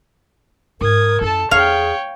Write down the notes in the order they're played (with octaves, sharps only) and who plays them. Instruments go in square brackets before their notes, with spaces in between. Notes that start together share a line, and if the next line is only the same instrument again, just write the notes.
[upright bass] G#2 [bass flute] A#4 [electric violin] D#6 G#6
[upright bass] F#2 E4 [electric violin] A4 A5
[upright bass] E2 [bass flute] G#4 [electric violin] C#5 G5 [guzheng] F5